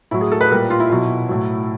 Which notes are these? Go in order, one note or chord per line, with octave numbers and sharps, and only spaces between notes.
A2 F#3 E4
G#4
A4
B4
A#2 G3 A#4
F4
E4
B2 F#3
A2 F#3